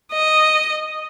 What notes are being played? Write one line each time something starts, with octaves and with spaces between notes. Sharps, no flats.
D#5